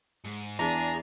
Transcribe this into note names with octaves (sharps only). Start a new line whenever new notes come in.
G#2
E2 D4 G#4 A#5